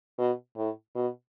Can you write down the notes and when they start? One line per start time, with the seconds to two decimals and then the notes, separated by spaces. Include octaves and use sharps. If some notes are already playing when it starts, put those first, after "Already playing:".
0.19 B2
0.57 A2
0.95 B2